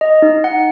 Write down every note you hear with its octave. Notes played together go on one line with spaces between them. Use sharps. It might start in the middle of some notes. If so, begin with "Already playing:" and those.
D#5
D#4
F#5